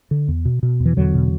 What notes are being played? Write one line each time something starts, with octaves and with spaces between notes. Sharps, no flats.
D3
E2
B2
B2
E2
E3
E2 D3 F#3
B2